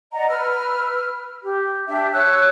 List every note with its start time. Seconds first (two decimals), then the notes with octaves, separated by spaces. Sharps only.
0.12 D5 D#5 F#5 A#5
0.29 B4 E6 F6
1.42 G4
1.87 D4 G4 E5
2.12 C#5 E6 F#6